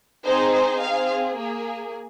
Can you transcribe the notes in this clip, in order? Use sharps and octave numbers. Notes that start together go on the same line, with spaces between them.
C4 D#4 G#4 C5
C5
C4 G#4 F5
A#3 G#4